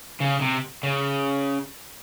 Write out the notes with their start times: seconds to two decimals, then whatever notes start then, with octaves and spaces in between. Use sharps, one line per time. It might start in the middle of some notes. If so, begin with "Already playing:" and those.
0.20 C#3
0.41 C3
0.83 C#3